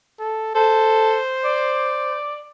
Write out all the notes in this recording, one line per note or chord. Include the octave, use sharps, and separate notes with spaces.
A4
A4 C5
D5